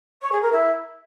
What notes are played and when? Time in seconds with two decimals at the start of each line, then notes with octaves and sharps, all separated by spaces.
0.21 C#5
0.32 G#4
0.42 A#4
0.52 E4